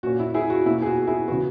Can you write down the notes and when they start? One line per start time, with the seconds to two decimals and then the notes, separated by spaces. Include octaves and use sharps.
0.03 A#2 A#3 C#4 F#4
0.19 E4
0.34 E4 G#4
0.50 F#4
0.66 B2 A#3 C#4 E4
0.82 G#4
0.86 F#4
1.07 E4 G#4
1.28 C#3 E3 B3 F#4